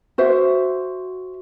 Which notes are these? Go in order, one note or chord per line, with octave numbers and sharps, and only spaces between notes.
F#4 C5 E5